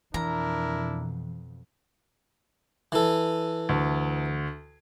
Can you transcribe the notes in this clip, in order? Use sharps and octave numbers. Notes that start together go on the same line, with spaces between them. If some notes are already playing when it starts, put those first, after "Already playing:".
F2 B2 E3 D4 E4 A#4 A#5
E3 A4
D2